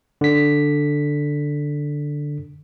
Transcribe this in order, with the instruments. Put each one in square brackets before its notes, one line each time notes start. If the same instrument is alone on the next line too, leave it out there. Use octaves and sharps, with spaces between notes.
[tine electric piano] D3 B6